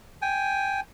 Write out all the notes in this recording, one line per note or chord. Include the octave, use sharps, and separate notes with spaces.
G5 G#5